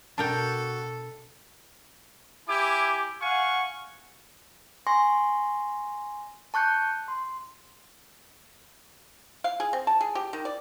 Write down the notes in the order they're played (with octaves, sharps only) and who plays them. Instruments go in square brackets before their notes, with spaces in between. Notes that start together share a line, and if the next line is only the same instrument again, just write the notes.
[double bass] B2 [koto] D4 A#4 G5 [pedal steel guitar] F#4 A5 [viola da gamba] A4
[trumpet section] E4 G4 G#5 D6
F5 F#5 G#5 C#6
[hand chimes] G#5 C6 C#6 A#6
A5 C#6 F#6 G6 C#7
C6
[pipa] F5
G#4
C4
A5
G#4
G4
D#3
D5